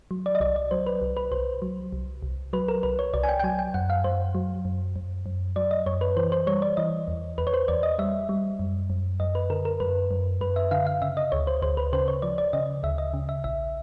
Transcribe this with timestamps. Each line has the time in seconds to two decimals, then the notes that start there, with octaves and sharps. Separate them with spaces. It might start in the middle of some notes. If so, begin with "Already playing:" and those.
0.11 F#3
0.26 D5
0.35 D#5
0.40 C2 D5
0.56 D5
0.71 F#3 C5
0.87 B4
1.01 C2
1.17 B4
1.32 C2 C5
1.62 F#3
1.93 C2
2.23 C2
2.53 F#3 B4
2.68 A#4
2.83 C2 B4
2.99 C#5
3.14 C2 D5
3.23 G#5
3.29 G5
3.39 G5
3.44 F#3 G#5
3.59 G5
3.74 F#2 F#5
3.90 F5
4.04 F#2 C5
4.35 F#3
4.65 F#2
4.96 F#2
5.26 F#2
5.56 F#3 D5
5.71 D#5
5.86 F#2 C#5
6.01 B4
6.17 E3 C5
6.32 C5
6.47 G3 C#5
6.62 D5
6.77 E3 D#5
7.08 E2
7.38 E2 B4
7.47 C#5
7.54 C5
7.68 E2 D5
7.83 D#5
7.99 G3 E5
8.29 G3
8.59 F#2
8.90 F#2
9.20 F#2 D#5
9.35 B4
9.50 D3 A#4
9.65 A#4
9.80 F#2 B4
10.11 F#2
10.41 F#2 B4
10.56 E5
10.71 D3 F5
10.87 F5
11.02 C#3 E5
11.17 D#5
11.32 D2 C#5
11.47 C5
11.62 D2 C5
11.77 B4
11.93 C#3 C5
12.08 C#5
12.22 F3 D5
12.38 D5
12.53 C#3 D#5
12.83 D2 E5
12.98 D#5
13.14 C#3
13.29 E5
13.44 A#1 E5